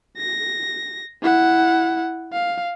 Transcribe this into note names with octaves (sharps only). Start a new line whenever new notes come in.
A#6
E4 F#5
F5